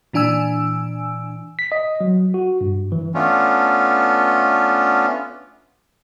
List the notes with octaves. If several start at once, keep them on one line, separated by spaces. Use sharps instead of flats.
A#2 E3 D4 G#5 E6
B6
D#5
F#3
F#4
G2
E3
A3 B3 C#4 D4 F4